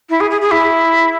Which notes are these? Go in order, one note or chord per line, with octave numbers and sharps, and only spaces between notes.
E4
G#4
G#4
G#4
E4